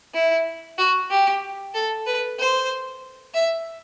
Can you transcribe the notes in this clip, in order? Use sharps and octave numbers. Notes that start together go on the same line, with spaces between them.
E4
F#4
G4
A4
B4
C5
E5